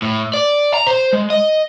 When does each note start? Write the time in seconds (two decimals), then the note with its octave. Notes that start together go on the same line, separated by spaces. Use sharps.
0.02 A2
0.34 D5
0.74 A#5
0.87 C5
1.13 G#3
1.30 D#5